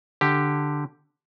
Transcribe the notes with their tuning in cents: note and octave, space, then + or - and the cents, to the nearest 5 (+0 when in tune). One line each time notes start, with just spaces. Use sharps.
D3 +5 G4 +0